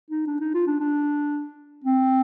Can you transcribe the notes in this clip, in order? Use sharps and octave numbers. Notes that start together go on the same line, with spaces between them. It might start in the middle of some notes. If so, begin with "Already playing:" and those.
D#4
D4
D#4
F4
D4
D4
C4